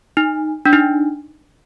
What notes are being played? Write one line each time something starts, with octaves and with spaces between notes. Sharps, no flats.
D#4
D4
D#4